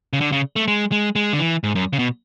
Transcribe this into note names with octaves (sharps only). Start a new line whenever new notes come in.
C#3
D3
C#3
A3
G#3
G#3
G#3
D3
E3
G#2
F#2
C#3
B2